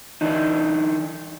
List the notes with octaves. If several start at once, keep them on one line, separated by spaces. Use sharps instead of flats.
E3 D4 D#4